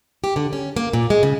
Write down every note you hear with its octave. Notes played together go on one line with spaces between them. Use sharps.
G4
D3
C#4
A#3
A#2
G#3
C#3